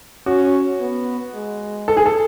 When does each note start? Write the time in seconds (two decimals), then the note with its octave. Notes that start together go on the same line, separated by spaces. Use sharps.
0.26 C#4 F#4
0.80 B3
1.34 G#3
1.88 A4
1.97 G#4
2.06 A4